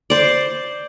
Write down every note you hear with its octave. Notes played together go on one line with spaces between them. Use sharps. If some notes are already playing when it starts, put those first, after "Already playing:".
C5 D5